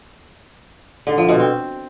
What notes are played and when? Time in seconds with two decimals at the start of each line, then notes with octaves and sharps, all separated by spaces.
1.07 D3
1.18 F3
1.29 B2
1.40 C4